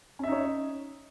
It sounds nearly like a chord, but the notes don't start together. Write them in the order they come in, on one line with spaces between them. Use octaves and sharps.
C#4 E5 D#4 C#5